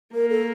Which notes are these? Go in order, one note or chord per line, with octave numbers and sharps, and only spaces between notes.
A#3 A#4
A4